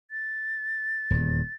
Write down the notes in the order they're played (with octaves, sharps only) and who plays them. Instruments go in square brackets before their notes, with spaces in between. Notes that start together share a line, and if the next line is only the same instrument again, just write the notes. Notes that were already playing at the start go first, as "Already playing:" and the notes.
[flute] A6
[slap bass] D#1 E2